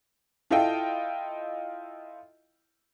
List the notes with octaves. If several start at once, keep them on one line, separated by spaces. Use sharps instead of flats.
E4 F4 A4 D#5 F5 G5